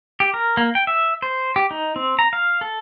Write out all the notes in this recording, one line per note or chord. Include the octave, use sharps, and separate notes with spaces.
G4
A#4
A#3
G5
E5
C5
G4
D#4
C4
A#5
F5
A4